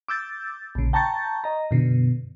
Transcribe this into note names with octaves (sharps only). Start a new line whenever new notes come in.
D6 E6 G6 A6
A#1 C#3
G5 A5 A#5 C#6 G6 A6
D#5 A#5
F#2 B2 D3